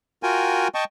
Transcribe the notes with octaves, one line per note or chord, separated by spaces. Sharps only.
F4 F#4 A#4 G5 G#5
D#5 G5 A5 C#6